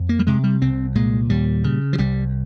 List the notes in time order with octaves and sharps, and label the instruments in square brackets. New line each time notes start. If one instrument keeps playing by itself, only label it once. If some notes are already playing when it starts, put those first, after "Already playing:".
Already playing: [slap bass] F2
A#3
G3
C3 G#3
G3
C2 C4
A#2 G#3
D#2 G3
C#3
F3
C2 G3